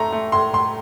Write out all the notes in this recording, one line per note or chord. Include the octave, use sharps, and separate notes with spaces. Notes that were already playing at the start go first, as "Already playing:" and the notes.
Already playing: A2 A3 A#5 C6
A3
A2 C6
A2 C6